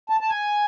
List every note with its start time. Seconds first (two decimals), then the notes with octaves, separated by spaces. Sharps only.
0.10 A5
0.21 A5
0.29 G#5